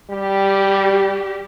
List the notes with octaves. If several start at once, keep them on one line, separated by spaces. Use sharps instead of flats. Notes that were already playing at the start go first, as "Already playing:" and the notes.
G3 G4